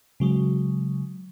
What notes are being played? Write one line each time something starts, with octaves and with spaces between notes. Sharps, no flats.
C#3 F#3 G#3